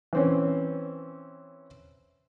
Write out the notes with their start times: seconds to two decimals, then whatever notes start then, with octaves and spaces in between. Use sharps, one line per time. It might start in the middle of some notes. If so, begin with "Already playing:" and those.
0.13 E3 C4 C#4